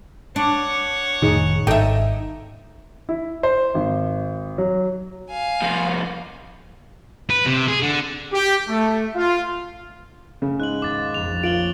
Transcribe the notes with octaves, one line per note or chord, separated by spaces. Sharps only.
D4 C#5 F#5
F1 A2 D#3 D#4 G#4
G#1 D#4 A4 E5 G5
E4
C5
G#1
F#3
F5 G#5
C2 F3
B4
C3
G#4
D3
G4
A3
F4
C#3
G#2 F#6 F#7
D#2 D6 A6
A#1 F2 F7
C#4 F4 D7 F#7 G7